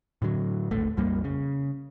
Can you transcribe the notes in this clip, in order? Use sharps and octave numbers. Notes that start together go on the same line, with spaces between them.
A2 D3 F#3
D#1 G#1 A3
A#1 F2 G3 A#3
C#3